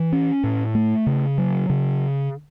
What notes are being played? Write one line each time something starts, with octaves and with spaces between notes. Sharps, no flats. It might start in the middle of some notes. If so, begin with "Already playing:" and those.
Already playing: E3
C#4
A2
A3
C#3
F#3
C#3